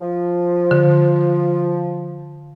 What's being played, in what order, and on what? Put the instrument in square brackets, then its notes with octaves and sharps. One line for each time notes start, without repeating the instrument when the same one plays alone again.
[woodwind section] F3
[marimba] D3